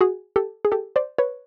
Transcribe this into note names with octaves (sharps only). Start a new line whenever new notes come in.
F#4 G#4
G4 A4
G#4
G4 A4
C5 D5
B4 C#5